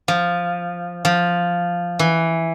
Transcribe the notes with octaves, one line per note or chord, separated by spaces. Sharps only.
F3
F3
E3